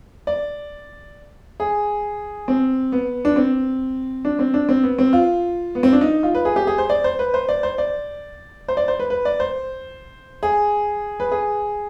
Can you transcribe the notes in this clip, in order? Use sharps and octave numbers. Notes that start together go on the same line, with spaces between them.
D5
G#4
C4
B3
D4
C4
D4
C4
D4
C4
B3
C4
F4
B3
C4
D4
D#4
F4
B4
G#4
G4
G#4
C5
D5
C5
B4
C5
D5
C5
D5
C5
D5
C5
B4
B4
D5
C5
G#4
B4
G#4